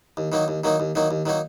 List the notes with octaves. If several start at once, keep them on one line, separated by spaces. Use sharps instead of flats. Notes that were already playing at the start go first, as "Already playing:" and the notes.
D#2
D#3 F#3 A#3 D#4
D#2
D#3 F#3 A#3 D#4
D#2
D#3 F#3 A#3 D#4
D#2
D#3 F#3 A#3 D#4